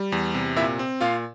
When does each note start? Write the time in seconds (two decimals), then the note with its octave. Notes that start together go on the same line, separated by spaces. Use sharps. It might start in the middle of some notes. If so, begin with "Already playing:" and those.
Already playing: G3
0.12 E2
0.34 C3
0.56 A#2 E4 E5
0.79 C4
1.01 A#2 F4 F5